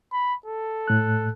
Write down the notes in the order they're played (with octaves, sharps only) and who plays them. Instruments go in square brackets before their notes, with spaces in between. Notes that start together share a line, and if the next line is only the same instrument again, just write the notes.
[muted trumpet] B5
A4
[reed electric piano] A2 F#6